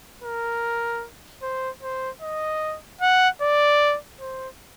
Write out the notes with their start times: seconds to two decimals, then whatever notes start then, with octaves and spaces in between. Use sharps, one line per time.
0.23 A#4
1.42 C5
1.82 C5
2.22 D#5
3.01 F#5
3.42 D5
4.20 C5